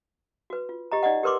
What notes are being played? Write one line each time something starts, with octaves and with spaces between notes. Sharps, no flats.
F#4 B4
F4
G4 D#5 A#5
D#4 D5 D#5 F#5
G4 A#4 B4 C6 D6